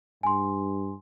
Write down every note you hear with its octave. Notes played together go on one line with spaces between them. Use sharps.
G2 G#5 C6